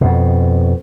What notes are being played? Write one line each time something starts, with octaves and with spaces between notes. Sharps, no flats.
F2 B2